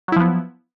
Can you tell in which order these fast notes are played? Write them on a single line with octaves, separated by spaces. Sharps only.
F#3 E4 F3 B3